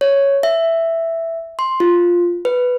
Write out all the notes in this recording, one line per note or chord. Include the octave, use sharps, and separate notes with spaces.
C#5
E5
C6
F4
B4